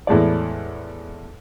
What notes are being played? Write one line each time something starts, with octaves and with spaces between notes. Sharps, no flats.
E2 A2 G#3 D5